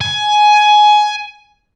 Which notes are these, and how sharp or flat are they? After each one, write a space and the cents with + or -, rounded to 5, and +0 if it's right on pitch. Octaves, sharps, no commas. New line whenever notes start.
G#5 +15